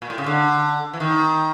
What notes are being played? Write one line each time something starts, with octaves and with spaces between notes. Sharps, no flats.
A#2
A2
C#3
D3
E3
D#3